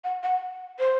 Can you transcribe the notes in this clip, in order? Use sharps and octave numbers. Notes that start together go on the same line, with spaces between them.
F#5
F#5
C5